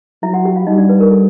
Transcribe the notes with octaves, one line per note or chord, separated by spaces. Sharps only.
F#3 E4 E5
F#4 F#5
G4 G5
F4 F5
G3 D#4 D#5
D4 D5
B4
A#4
A4